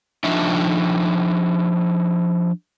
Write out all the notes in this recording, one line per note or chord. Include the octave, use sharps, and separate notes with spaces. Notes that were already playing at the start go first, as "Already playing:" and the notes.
F3 D4 D#4 E5